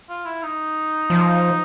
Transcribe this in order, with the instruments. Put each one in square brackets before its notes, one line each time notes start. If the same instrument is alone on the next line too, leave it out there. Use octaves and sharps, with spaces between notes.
[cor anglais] F4
E4
D#4
[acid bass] F3